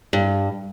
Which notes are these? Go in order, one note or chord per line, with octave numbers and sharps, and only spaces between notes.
G2